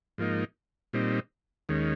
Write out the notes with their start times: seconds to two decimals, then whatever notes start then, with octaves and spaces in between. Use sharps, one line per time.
0.18 G#2 F3 A#3 D#4
0.93 A#2 G3 C4 D#4
1.69 D#2 D#3 G#3 C#4